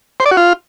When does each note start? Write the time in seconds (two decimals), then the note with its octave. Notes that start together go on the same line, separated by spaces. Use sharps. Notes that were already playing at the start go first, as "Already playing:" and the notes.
0.20 C5
0.26 D5
0.31 F#4
0.37 F4